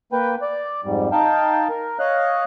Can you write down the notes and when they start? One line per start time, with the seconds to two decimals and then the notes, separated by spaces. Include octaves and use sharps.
0.13 A#3 B4 G5
0.42 D5
0.85 F2 G#2 G3
1.12 D#4 F5 G5 A5
1.69 A#4
1.99 C#5 D#5 F5 F#6